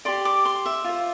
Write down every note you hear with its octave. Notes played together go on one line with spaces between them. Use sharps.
G4 D5 C6
D6
C6
E5
F4 C5